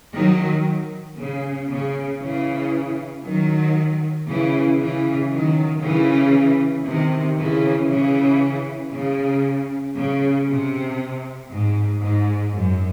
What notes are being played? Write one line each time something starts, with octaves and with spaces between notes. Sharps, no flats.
D#3 F#3
C#3
C#3
C#3 E3
D#3 F#3
C#3 E3
C#3 E3
D#3 F#3
C#3 E3
C3 D#3
C#3 E3
C#3 E3
C#3
C#3
C3
G#2
G#2
F#2